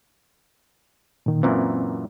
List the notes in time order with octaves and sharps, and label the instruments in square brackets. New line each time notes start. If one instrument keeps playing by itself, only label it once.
[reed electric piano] A#2 D#3
[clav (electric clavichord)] F#2 A#2 E3 [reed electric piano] C4